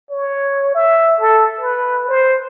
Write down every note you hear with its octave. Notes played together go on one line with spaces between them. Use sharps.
C#5
E5
A4
B4
C5